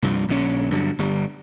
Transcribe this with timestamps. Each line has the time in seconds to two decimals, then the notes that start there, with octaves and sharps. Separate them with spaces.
0.02 C2 G2 F3
0.29 A#1 D3 C#4
0.71 G2 D3 F#3
0.99 G1 G3